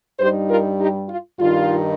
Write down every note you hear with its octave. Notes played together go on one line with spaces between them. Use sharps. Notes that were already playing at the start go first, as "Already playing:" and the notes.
G2 G3 D#4 G4 C5
F4 A#4
D#4 G4
F4
G2 D#3 G3 D#4 F4